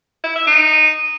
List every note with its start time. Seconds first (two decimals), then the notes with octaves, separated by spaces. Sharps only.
0.24 E4
0.35 E5
0.47 D#4